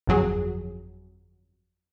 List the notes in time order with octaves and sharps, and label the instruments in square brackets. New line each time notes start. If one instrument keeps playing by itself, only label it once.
[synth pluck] G1 F2 F#3 G#4